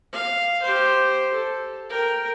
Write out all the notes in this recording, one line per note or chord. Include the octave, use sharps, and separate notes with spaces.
F5
G4 C5
A4
A#4 G5